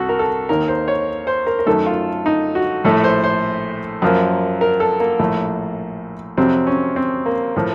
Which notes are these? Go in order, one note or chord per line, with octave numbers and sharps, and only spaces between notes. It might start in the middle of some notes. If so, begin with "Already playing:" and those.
Already playing: C2 F#4 A4
A#4
A4
D#2 D#3 A#3 A#4
C5
C#5
C5
A#4
A#4
F#2 D#3 A3 A4
F4
D#4
F#4
A#1 A2 A3 A4
C5
C5
F#2 F3 A#3
A#4
A4
A#3
A#1 A2 A3
F2 C3 F#3 C4
C#4
C4
A#3
A2 F3